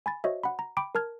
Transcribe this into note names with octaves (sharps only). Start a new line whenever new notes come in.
G#5 B5 A6
F#4 C5 C#5 D#5 E5
F#5 B5
A#5
G5 B5 D6 D7
A#4 A5 F6 G#6